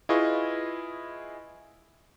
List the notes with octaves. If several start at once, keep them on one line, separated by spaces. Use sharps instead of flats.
E4 F4 G#4 B4 D#5 C#6